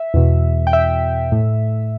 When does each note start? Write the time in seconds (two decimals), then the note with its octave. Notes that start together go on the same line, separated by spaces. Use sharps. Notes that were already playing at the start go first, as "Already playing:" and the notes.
Already playing: E5
0.14 E2 B2
0.67 G5
0.73 E5
1.32 A2